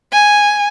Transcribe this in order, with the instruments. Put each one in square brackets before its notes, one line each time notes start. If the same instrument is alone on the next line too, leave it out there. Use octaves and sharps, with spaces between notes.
[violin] G#5